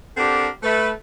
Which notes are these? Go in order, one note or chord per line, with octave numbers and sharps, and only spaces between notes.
C4 D4 G4 A4 A#4 F#5
A3 B4